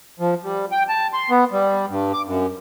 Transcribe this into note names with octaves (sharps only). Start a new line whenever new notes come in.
F3
G3
G5
A5
C6
B3
G3
G2
D6
F#2